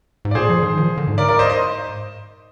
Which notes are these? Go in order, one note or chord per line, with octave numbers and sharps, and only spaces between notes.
G#2
D5
A#2 G#4 C5
F3
D#3
F3
D3
G#2
A#4 D5
A#4 D5
C5 D#5
C5 D#5